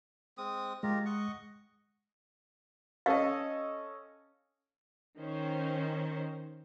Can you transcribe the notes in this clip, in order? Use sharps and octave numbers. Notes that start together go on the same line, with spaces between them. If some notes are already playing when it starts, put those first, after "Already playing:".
G#3 C4 D#6
G#3 F4 G4 A#4
D#5 F#5 C#6
C#4 A4 D#5 F5
D#3 C#4 C5